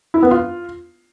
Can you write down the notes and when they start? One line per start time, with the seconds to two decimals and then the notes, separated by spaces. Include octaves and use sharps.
0.14 E4
0.23 B3
0.31 F4